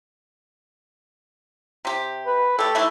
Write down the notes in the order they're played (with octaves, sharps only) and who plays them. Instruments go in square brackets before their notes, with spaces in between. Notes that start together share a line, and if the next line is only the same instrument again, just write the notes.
[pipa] C3 G4
[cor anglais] B4
[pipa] A3 G4 [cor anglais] A4
[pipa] D#3 E3 A3